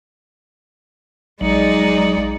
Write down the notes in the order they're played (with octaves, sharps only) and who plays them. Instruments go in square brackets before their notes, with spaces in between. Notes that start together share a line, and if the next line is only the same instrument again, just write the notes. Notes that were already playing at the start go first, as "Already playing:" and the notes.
[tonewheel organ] A#1 F#3 [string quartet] G#3 D#4 D5